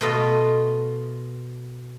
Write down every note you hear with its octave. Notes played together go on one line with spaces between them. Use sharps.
B2 A3 F4 D#5